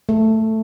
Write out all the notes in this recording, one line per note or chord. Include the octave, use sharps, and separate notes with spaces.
A3